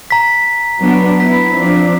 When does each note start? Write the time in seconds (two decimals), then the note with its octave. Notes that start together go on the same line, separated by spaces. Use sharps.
0.11 A#5 B6
0.80 F#3 B3 D4
1.20 B3 E4 B6
1.54 F3 C4 D4